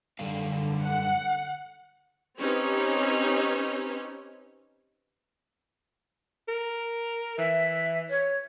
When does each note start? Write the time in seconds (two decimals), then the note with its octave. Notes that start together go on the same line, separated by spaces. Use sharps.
0.19 F#2 D3 G3 F5
0.84 F#5
2.39 C4 C#4 D#4 G4 B4 C#5
6.48 A#4
7.38 E3 E5
8.10 C#5